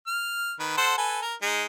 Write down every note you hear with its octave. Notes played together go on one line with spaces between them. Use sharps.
F6
D#3 B4
A4 C5 F#5
A4 B4 G#5
A#4
G#3 D#4